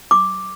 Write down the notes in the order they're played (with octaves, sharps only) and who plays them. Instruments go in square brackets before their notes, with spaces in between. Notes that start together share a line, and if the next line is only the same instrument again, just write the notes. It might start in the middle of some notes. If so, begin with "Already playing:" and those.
[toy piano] D6